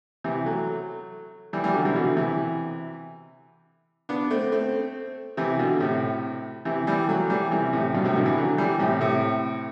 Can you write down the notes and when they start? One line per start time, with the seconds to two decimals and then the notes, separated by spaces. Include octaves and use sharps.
0.24 C3 E3
0.46 F#3 A3
1.53 E3 G3
1.64 E3 G3
1.74 D3 F#3
1.85 C3 E3
1.95 B2 D3
2.17 C3 E3
4.09 B3 D4
4.30 A3 C4
4.52 A3 C4
5.37 C3 E3
5.59 B2 D3
5.80 A2 C3
6.65 C3 E3
6.87 E3 G3
7.08 F#3 A3
7.30 E3 G3
7.51 C3 E3
7.73 A2 C3
7.94 G2 B2
8.05 A2 C3
8.15 B2 D3
8.26 C3 E3
8.37 D3 F#3
8.58 E3 G3
8.79 A2 C3
9.01 A2 C3